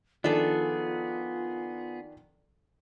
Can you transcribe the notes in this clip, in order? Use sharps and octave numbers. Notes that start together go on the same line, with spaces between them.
D#3 F3 B3 D4 F4 G#4 A4 E5